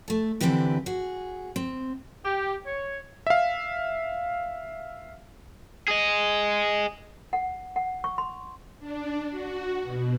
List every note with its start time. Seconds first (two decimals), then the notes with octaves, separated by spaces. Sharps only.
0.08 A3 A4
0.41 D3 E3 C4 D4 G4 B4
0.86 F#4 G#4
1.56 C4
2.25 G4
2.65 C#5
3.27 E5 F5
5.88 G#4 D#5
7.33 F#5
7.76 F#5
8.04 C#6
8.18 C6
8.79 D4
9.31 F#4
9.83 B2